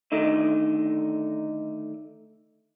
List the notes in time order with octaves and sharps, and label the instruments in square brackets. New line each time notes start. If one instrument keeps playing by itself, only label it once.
[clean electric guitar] D3 D#3 A3 D#4